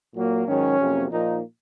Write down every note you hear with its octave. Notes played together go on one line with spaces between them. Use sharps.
A#2 F#3 A#3
G#2 D#3 F#3 C#4
F2 C3 F#3 A#3
A#2 F3 A#3 D#4